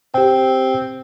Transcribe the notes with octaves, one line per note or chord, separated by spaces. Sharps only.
C4 G4 G5